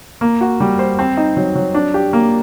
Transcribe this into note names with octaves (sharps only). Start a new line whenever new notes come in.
A#3
F#4
G3
C5
C4
D#4
F#3
F#3
D4
G4
A#3